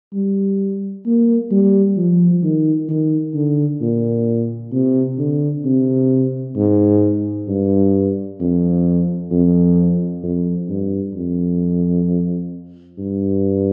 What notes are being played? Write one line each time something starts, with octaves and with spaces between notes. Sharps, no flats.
G3
A#3
G3
F3
D#3
D#3
D3
A#2
C3
D3
C3
G#2
G2
F2
F2
F2
G2
F2
G2